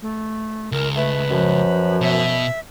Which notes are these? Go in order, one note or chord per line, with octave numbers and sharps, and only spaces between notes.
A3
C#2 A#4
A3 B4
F#2 F3
B2 E5